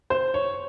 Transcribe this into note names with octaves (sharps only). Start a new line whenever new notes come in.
C5
C#5